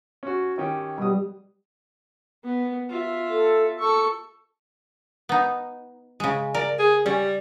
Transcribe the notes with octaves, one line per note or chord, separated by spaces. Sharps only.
C#4 F#4
D#3 C#4 G4
B2 G3 D#6
B3
F4 E5
A4
A4 C#6 E6
B3 D#4
C#3 G#3
A#4 D5
G#4
G3 C#4